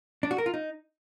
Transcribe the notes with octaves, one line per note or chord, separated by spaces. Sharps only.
D4
F#4
A#4
F4
D#4